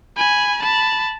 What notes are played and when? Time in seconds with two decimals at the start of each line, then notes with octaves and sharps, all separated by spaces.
0.18 G#5 B5
0.62 A5 B5